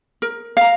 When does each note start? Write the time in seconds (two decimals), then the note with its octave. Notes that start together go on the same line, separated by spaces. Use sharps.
0.22 A#4
0.57 F5 A#5